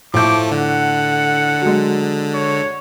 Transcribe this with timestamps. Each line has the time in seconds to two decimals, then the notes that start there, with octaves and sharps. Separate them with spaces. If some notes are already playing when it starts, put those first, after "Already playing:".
0.14 A2 F3 A3 D6 G6
0.52 D3 F#5
1.62 F#3 G#3
2.34 C#5